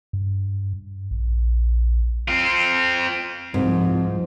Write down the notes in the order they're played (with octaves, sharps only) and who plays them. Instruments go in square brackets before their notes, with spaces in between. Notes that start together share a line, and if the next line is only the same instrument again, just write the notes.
[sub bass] G2
A#1
[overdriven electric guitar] C4 F4
[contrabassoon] C2 [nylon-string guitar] G#2 [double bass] F3